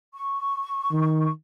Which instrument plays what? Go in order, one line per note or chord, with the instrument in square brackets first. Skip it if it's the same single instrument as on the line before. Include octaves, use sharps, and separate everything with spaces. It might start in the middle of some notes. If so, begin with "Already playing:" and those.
[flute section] C#6
[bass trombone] D#3